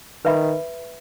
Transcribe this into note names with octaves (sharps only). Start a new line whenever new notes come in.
D#3 B4 E5 B5